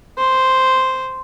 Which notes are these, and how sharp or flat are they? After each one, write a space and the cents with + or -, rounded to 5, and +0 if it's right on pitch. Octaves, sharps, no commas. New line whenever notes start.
C5 -5